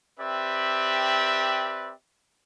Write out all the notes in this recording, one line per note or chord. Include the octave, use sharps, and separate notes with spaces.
C4 G4 B4 D5 E5